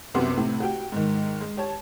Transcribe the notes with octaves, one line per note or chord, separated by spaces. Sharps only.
C2 F#2 C3 B3 F#4 C6
A2 C3
F#4 G4 G5
G#2 D#3
G#3
G4 C#5 A5